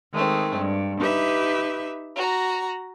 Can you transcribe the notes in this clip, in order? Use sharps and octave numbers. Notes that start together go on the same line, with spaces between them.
D#3 G#3 A3 C4
G2
D#4 G4 B4 E5
F#4 A#5